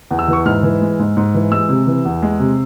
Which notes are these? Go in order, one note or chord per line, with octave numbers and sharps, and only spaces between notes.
E2
E6
E3 C#6
G#2 F6
E3
G#3
G#2
G#2
E3
G#3 E6
C3
E3
E2
G#3
C3